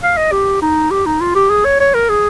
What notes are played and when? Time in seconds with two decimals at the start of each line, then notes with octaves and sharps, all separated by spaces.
0.03 F5
0.17 D#5
0.32 G4
0.62 D#4
0.91 G4
1.06 D#4
1.21 F4
1.35 G4
1.50 G#4
1.65 C#5
1.80 C#5
1.95 A#4
2.09 G#4